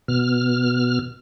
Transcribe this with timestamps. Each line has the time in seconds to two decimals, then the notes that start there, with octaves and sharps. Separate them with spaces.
0.08 B2 F6